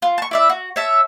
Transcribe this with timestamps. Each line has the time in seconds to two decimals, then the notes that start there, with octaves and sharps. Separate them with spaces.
0.02 F4
0.18 A5 C#6
0.31 E4 D5 E5
0.49 F#4
0.76 C#5 E5 A5